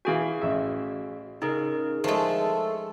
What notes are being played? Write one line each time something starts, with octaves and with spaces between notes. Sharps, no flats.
E3 F#4 G#4 F5 G#5
A1 E5
C#3 D#4 G#4 A#4
F3 G#3 A3 A4